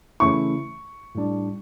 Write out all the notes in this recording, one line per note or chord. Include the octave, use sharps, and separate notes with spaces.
C#3 E3 A3 C#4 E4 C#6
A2 G3 D4